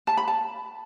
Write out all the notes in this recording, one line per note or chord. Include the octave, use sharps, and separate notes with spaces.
A5
B5
A5